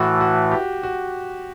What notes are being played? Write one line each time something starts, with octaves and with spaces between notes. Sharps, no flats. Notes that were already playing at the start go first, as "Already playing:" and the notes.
Already playing: A2 E3 A3 F#4
F#4
G4
F#4